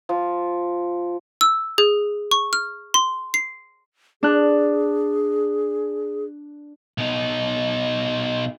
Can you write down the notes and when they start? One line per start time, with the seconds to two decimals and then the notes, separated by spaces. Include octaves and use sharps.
0.09 F3
1.41 E6
1.78 G#4
2.31 C#6
2.53 F6
2.94 C6
3.34 C7
4.23 D4 G#4 F#6
6.98 B2 D#4